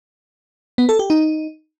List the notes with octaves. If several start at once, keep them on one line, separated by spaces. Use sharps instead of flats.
B3
A4
G4
D#4